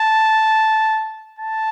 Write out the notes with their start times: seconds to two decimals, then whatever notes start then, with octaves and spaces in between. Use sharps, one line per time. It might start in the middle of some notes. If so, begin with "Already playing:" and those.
Already playing: A5
1.39 A5